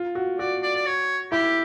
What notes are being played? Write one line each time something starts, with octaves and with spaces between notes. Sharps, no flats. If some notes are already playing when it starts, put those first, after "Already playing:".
Already playing: F4
F#4
F#4 D5
D5
D5
C#5
E4 G4